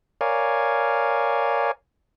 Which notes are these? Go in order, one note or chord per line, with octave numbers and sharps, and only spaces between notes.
A#4 C#5 D5 F5 G#5